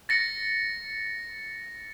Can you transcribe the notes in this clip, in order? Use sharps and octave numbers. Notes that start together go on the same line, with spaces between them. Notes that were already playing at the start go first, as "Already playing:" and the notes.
A6 A#6 C#7